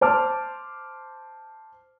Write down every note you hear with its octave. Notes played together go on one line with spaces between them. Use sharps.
C5 A5 D6 F6